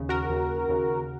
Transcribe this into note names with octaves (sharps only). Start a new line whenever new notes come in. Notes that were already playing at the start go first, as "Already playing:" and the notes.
Already playing: D#2 C#3
F#4 A#4
D#2 C#3
D#2 C#3